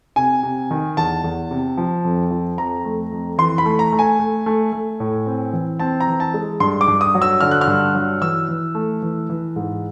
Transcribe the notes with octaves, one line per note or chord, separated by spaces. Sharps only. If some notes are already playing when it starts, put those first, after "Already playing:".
C3 G#5
C3
D#3
E2 A5
E2
C3
F3
F2
F3
F2 A#5
A3
F2
E3 C6
B5
A3
A#5
A3
G#5
A3
A3
A3
A2
C4
E3
C4 A5
A#5
E3
A5
G#3
G2 C6
D6
G2
D#6
F#3
E6
D3 F6
F#6
F6
G2
F#3
E3 E6
E3
A3
E3
E3
G#2